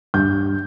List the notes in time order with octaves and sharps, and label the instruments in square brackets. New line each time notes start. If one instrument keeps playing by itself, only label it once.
[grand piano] G2 G6